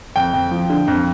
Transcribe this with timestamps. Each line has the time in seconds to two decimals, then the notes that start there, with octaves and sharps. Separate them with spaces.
0.16 F2 G5
0.33 F2
0.51 F3
0.70 D3
0.88 F2